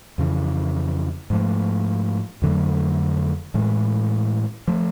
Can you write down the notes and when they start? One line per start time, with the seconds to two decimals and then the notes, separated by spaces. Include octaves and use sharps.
0.18 F2 C#3 E3
1.30 G#2 F3 A3
2.42 F2 D3 F#3 A3
3.54 A2 E3 G#3
4.68 F3 A3